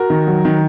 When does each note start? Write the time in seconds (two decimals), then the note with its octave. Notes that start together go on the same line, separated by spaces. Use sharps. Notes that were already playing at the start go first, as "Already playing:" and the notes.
Already playing: F#4 A#4
0.10 D#3
0.27 F#3
0.45 D#3